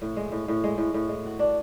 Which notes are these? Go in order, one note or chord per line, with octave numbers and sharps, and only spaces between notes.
A2
G#3
A2
A2
G#3
A2
A2
G#3
F#4
D4